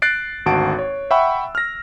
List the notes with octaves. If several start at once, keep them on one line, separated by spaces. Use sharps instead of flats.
F#6 A6 C7 D7
G#1 D2 F#4 F#5 A5 D7
C#5
E5 F#5 G5 B5 C#6 E6
F6 A#6